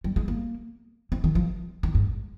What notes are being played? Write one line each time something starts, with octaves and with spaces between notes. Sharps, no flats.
G3
G#3
A#3
C4
D#3
F3
D#3
G#2